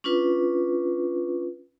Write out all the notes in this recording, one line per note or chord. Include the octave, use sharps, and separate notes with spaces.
C#4 D4 F4 B4